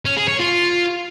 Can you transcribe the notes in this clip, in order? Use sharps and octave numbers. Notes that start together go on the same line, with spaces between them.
C#4
G#4
C#5
F4